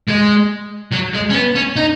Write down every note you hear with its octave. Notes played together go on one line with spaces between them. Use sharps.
G#3
F#3
G#3
C#4
B3
C#4
D#4